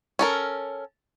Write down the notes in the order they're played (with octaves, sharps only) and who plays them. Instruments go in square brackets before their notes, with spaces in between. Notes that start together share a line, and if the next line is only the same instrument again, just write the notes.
[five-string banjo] C#4 A4 A#4